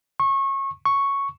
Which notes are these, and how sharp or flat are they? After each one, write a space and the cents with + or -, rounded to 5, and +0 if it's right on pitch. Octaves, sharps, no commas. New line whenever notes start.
C#6 -25
C#6 +0